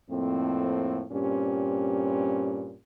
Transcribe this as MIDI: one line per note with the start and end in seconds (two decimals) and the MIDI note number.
0.10 1.04 41
0.10 1.04 45
0.10 1.04 58
0.10 1.04 60
1.12 2.76 43
1.12 2.76 46
1.12 2.76 60
1.12 2.76 61
1.12 2.76 67